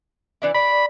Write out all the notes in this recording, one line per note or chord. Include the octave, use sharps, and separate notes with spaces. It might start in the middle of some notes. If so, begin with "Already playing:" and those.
E3 D4 E4
D5 B5